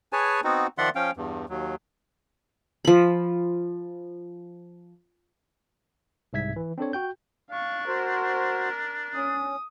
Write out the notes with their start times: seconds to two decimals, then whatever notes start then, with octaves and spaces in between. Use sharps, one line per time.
0.13 G#4 B4 C#5 G#5 A5
0.44 B3 C4 D#4 F#4
0.78 D#3 F3 D5 E5 F#5 C6
0.95 F3 C#4 F5 G5
1.17 E2 G2
1.49 D#2 F#3
2.85 F3 B5
6.33 C2 G#2 E5 G#6 B6
6.56 E3
6.78 C4 D4 A4 C#5
6.93 F#4 G5 G6
7.51 D4 F5 C#6
7.87 F#4 A#4 C5
9.15 C#4 D#6